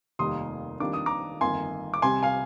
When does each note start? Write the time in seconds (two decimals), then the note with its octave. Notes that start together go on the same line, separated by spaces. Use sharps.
0.19 F1 D#2 D#3 G3 A#3 C6 D#6
0.80 F2 D#3 G3 A#3 D4 D6
0.93 D#6
1.06 A#5 D6
1.41 G1 F2 D#3 A#3 G#5 C6
1.94 D6
2.02 C2 C3 G3 G#5 C6
2.23 F5 G#5